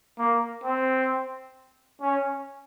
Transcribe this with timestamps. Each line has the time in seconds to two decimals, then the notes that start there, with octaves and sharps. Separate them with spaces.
0.18 A#3
0.64 C4
2.01 C#4